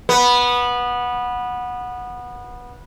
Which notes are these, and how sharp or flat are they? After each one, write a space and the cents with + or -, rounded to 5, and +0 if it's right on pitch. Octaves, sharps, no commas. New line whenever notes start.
B3 -15